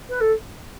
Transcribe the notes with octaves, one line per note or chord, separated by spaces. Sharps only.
B4
A4